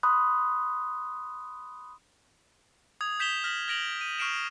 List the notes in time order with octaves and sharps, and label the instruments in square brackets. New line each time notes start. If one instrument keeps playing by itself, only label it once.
[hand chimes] B5 C6 D#6 F#6
[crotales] D#6 G#6 F7
G6 B6 E7 F7 G7
F6 A#6 B6 F#7
F6 G#6 A#6 D7 F7 F#7
D#7
C#6 F6 C7 D7 E7 F#7